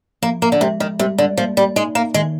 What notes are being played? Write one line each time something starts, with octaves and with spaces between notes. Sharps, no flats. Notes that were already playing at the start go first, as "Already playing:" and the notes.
F3 A#3
A#3
D3
C3 G#3
D#3
C3 G3
D3
F3 A#3
G3
G#3 D#4
A#3
D#3 G#3